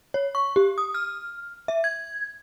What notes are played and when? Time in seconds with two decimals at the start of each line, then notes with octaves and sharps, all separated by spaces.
0.14 C#5
0.35 C#6
0.56 G4
0.78 D#6
0.95 F6
1.68 E5
1.84 G#6